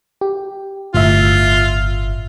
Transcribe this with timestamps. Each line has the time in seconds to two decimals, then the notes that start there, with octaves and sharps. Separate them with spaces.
0.21 G4
0.95 G1 A2 F4 E5